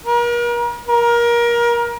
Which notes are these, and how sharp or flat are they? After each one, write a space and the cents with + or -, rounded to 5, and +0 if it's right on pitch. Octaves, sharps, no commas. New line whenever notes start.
A#4 +40
A#4 +25